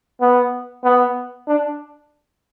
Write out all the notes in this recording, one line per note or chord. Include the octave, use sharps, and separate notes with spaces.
B3
B3
D4